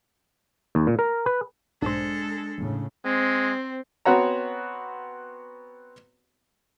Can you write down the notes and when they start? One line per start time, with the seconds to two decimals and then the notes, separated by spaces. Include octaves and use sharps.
0.75 D#2
0.87 A#2
0.99 A#4
1.26 B4
1.82 B1 G#2 G#3 D4 A4 C5
2.58 G1 E2 A2 C#3
3.05 G#3 C4
4.05 B3 C4 F#4 C#5 A#5